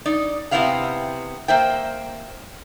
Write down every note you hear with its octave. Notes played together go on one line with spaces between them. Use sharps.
D#4 D5
C3 B3 C4 E4 F5 F#5
A#3 C5 E5 G5